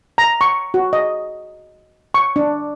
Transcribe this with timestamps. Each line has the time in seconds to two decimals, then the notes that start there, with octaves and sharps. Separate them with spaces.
0.18 A#5
0.41 C#6
0.74 F#4
0.93 D#5
2.14 C#6
2.36 D4